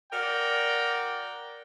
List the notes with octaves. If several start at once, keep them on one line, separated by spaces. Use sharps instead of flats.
F#4 A#4 D5 G5